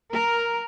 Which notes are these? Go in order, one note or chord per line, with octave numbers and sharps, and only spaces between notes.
A#4